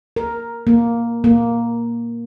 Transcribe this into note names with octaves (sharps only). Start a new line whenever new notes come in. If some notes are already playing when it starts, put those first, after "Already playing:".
A#4
A#3
A#3